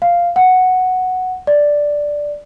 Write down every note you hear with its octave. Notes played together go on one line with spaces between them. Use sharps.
F5
F#5
D5